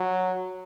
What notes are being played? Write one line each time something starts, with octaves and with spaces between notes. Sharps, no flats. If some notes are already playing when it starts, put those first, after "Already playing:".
Already playing: F#3